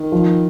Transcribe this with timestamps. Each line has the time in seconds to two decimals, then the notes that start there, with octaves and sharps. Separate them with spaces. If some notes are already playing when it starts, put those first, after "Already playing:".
Already playing: D#3
0.12 F3